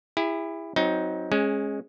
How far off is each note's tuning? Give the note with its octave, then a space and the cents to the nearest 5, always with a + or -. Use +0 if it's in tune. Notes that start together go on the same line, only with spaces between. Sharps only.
E4 +5 G#4 -45
F#3 +0 C4 +0 D#4 +20
G#3 +0 C#4 -20